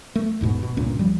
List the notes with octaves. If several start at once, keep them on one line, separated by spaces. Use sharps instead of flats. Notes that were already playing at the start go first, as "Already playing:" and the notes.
A3
E1 G#2 B2
B2
C#2 G2 A#2 C#4
F3 G3